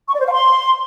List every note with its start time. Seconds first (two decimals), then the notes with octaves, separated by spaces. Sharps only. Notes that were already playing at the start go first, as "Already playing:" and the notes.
0.08 C#6
0.14 D5
0.20 C5
0.25 F5
0.31 C6